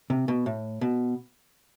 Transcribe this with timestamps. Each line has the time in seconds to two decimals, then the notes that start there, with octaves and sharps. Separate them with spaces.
0.10 C3
0.28 B2
0.46 A2
0.81 B2